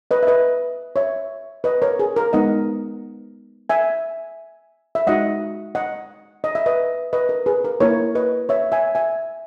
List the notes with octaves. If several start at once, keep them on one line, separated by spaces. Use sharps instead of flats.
B4 D#5
E5
B4 D#5
C#5 E5
B4 D#5
A#4 C#5
G#4
A#4
G#3 B3 D#4 D#5 F#5
E5 G#5
E5
G#3 D#4 F#4 D#5 F#5
D#5 F#5
D#5
E5
B4 D#5
B4 D#5
A#4
G#4 B4
A#4
A#3 E4 A#4 C#5
B4 D#5
C#5 E5
E5 G#5
E5 G#5